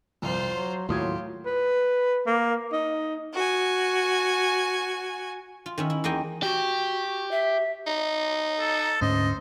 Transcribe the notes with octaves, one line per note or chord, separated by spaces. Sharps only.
C2 F2 F4 C5
F#3 C6
D#2 A2 F#3 F4 G4 C6 D#6 G#6
B4
A#3
D#4
F#4 G#5
F4
D#3 C#4 E5
E4
E2 A#3 D#4 D#5 G5 G#5
F#4 G4
E5
D#4
A4
D2 G#2 C#4 C5 D#5